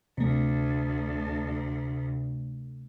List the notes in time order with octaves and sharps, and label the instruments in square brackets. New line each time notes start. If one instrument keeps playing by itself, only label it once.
[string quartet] D2 [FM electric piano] C3 A3